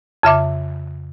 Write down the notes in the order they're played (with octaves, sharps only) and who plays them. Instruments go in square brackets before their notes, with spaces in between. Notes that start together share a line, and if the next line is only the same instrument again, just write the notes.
[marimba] F2 C#3 E5 D6